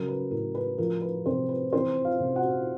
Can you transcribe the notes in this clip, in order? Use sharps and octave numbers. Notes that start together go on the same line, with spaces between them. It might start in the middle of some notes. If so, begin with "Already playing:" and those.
Already playing: C#3 F#3 A#4
B4
A2 A#4
B4
F3 A#4
B4
C3 C4 C5
B4
E3 C4 C5
F4 F5
C3
F#4 F#5